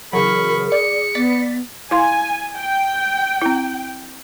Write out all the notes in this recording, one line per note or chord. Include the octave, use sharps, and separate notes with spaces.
C#3 E3 F#3 G#4 A#4 B5 C#6
D5 C#7
B3 D5 A6 B6
E4 F5 G#5 C6
G5
C4 E4